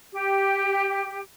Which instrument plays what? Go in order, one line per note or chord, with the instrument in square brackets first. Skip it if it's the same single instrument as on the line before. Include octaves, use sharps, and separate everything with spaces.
[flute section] G4